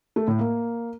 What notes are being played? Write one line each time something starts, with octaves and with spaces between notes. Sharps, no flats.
A3
A2
A#3